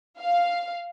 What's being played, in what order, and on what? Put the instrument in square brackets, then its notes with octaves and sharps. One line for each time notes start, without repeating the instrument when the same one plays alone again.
[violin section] F5